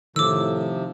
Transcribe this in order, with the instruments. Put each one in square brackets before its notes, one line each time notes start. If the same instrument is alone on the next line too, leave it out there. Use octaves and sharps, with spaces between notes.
[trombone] A2 [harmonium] C3 F3 [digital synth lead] D#3 [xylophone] D6 E6